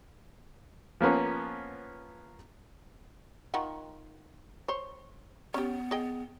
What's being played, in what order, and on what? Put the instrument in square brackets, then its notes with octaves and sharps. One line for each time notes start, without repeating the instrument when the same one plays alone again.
[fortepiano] F3 A#3 B3 C#4
[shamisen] D#3 F4 F#5
C5 C#5
[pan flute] B3 [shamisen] C#4 G4
[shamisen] G#4 D#5 G5